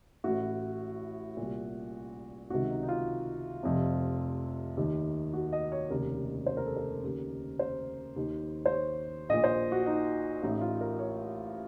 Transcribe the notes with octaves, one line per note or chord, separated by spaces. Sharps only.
A1 A2 F#4
C2 A#2
C#2 C3 D#3 F#4
D#4
D#4
F4
F1 F2 C3
D#2 D#3
F#4
D#5
C#5
F1 D#2 C#3 A#4
C5
A#4
A4
A#4
D#2 C#3
C5
D#2 D#3
C5
C#5
A#1 A#2 D#5
C5
F#4
D#4
A1 A2 D#4
F4
A#4
C#5